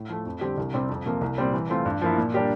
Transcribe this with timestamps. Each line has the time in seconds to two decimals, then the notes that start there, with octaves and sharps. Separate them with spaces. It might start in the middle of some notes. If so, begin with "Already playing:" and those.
Already playing: A2
0.09 F3 A3
0.25 F2
0.41 D3 G3 C4 G4
0.57 C2
0.74 C3 G3 C4
0.89 F2
1.06 C3 F3 A#3
1.21 C2
1.38 A#2 G3 C4
1.53 E3
1.70 A3 C4 F4
1.85 G2
2.02 F3 A#3 E4
2.18 A#2
2.34 G3 D4 G4 A#4